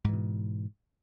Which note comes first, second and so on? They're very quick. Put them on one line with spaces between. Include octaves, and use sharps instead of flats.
G#2 E3 B2